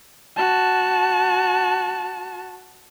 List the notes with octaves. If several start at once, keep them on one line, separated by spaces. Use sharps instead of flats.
F#4 A5